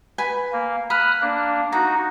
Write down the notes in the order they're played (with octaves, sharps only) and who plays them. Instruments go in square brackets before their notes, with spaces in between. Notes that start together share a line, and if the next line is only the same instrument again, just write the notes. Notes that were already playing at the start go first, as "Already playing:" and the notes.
[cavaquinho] B4 G#5 B5
[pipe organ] A#3
[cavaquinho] B5 [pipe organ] D#6 F6 F#6
[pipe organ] A#3 D4
[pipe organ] D#4 F#4 [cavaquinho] A#5